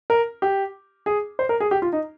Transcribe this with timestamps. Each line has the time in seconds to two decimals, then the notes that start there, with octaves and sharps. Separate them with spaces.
0.10 A#4
0.42 G4
1.06 G#4
1.39 C5
1.49 A#4
1.60 G#4
1.71 G4
1.82 F4
1.93 D#4